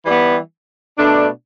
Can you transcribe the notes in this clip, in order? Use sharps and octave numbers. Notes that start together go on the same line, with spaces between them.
E3 G3 B3
B2 A3 D4